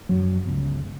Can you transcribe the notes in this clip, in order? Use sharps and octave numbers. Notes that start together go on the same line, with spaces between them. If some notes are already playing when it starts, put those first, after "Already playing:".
F#2 F#3
G1 C#2